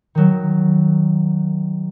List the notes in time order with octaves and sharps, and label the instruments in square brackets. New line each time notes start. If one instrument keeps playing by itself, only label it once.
[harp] D#3 F#3